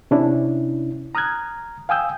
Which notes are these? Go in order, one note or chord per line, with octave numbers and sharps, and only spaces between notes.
C3 C#4 D4 E4
A#5 D#6 F6 F#6 G#6
F5 G5 G#5 D#6 E6 G6